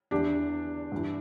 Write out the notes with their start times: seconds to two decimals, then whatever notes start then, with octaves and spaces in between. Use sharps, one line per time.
0.11 E2 E3 D4 G4
0.92 G2 E3